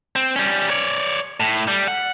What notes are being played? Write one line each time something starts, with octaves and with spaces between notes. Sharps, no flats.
C4
G3 C#4
C#5 D5
A2
G3
F#5